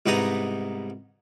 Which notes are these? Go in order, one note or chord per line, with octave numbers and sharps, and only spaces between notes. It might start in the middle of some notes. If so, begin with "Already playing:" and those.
C2 G#2 B3 D#4 A#5 D#6